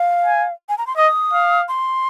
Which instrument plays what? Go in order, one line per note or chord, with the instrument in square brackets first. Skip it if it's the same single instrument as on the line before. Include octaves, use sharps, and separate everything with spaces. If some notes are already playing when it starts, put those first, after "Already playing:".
Already playing: [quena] F5
[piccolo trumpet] G#5
[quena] G#5
A#5
C6
[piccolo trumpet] D#5 [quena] D#6
[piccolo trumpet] F5
[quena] C6